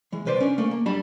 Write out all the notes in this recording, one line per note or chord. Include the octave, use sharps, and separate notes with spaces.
E3 G#3
C2 B4 C5 D5
C#4 D4
A3 A#3
A#3
F#3 G3 D4 A5 B5